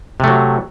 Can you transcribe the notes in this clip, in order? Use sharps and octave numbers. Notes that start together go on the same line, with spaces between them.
C3 F#3 A3